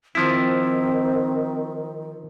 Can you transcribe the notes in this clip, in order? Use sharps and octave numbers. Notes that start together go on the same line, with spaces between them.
D#3 F3 C4 E4